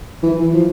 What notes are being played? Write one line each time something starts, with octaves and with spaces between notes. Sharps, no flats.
E3
F3